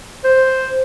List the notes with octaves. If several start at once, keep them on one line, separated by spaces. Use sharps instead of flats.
C5